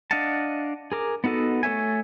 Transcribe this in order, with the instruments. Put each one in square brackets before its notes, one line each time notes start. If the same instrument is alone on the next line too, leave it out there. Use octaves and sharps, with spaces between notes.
[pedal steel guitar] D4 D#5 F5 F#5 A5
G#4 A#4 D6
B3 D#4 F#4 A4 D#5
A3 A4 C#5 E5 G#5